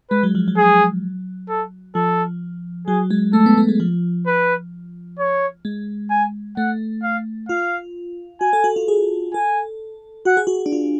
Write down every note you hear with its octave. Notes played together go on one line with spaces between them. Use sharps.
G#3 B4
F#3
F3
F#3
G#4
A4
F3 A4
F#3 G#4
G#3
A3 A4
B3
A3
G#3
F3
B4
C#5
G#3
G#5
A3 F#5
F5
F4 F5
F#4 G#5
A4
F#4
F4
G#4
A4 G#5
F#4 F#5
G#4
F#4
D4
F4